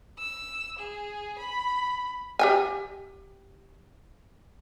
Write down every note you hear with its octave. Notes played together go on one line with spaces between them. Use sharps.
E6
G#4
B5
G4 G5 G#5